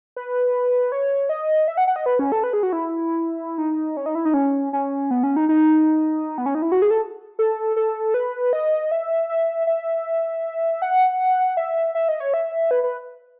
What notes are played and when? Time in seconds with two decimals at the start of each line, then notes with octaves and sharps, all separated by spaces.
0.16 B4
0.92 C#5
1.29 D#5
1.68 E5
1.77 F#5
1.87 F#5
1.96 D#5
2.06 B4
2.19 C#4
2.32 A4
2.44 B4
2.53 G#4
2.63 F#4
2.73 E4
3.58 D#4
3.97 C#4
4.06 D#4
4.15 E4
4.25 D#4
4.34 C#4
4.73 C#4
5.11 B3
5.23 C#4
5.36 D#4
5.49 D#4
6.38 B3
6.46 C#4
6.55 D#4
6.62 E4
6.72 F#4
6.82 G#4
6.91 A4
7.39 A4
7.76 A4
8.14 B4
8.53 D#5
8.92 E5
9.29 E5
9.67 E5
10.82 F#5
11.57 E5
11.95 E5
12.09 D#5
12.20 C#5
12.34 E5
12.71 B4
12.83 B4